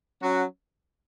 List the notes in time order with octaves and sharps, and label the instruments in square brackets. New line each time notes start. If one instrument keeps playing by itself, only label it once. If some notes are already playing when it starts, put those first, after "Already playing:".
[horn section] F#3 C#4 F#4